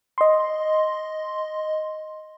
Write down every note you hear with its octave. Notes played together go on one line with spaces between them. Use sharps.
D#5 C6